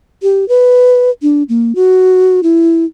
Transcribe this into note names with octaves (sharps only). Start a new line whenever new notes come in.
G4
B4
D4
A#3
F#4
E4